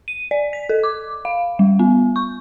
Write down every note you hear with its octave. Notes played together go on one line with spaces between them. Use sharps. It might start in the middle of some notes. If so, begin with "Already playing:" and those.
D#7
D5
B6
A4
D6
F5
G3
B3
C#6